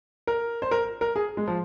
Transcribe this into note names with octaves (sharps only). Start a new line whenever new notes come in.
A#4
C5
A#4
A#4
G#4
G#3
F3